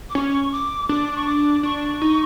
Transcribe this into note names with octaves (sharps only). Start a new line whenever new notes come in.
D6
C#4 C#6
D6
D4 D6
C#6
D6
D4 C#6
D#4